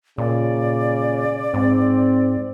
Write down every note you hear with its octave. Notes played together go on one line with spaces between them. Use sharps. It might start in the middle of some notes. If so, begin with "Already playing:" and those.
A#2 C#3 D5
G#2 C4